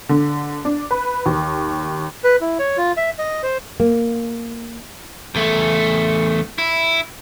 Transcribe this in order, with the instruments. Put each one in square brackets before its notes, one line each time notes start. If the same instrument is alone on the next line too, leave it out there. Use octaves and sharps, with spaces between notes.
[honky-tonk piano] D3
D4
B4
D#2
[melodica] B4
E4
C#5
F4
E5
D#5
C5
[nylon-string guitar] A#3
[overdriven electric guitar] E2 A3
E4